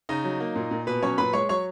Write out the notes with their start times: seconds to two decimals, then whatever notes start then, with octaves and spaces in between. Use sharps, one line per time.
0.09 C#3 D#4 D#5
0.24 F#3
0.40 A#3
0.55 A#2
0.71 A#2
0.87 B2 B4
1.02 F#3 C#4 C#5
1.18 A#2 B4 B5
1.33 G#3 C#5 C#6
1.49 F#3 C#5 C#6